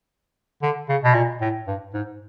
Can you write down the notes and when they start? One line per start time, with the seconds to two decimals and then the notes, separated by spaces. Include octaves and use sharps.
0.62 D3
0.89 C#3
1.04 B2
1.14 A#2
1.41 A2
1.67 G2
1.94 G#2